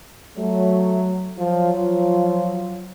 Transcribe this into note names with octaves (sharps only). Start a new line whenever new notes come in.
F#3 A3
F3 F#3 F4
F3